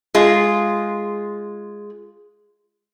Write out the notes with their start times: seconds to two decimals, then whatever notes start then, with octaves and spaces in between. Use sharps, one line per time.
0.15 G#3 F4 G#4